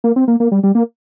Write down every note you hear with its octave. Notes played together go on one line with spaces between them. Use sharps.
A#3
C4
A#3
A#3
G3
G3
A#3